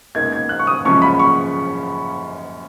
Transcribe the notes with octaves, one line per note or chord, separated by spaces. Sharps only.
C#2 B2 A#3 D#4 G#6
G#6
F#6
C#6
D#6
F#2 C#3 F3 G#3 C#4 C#6
B5
C#6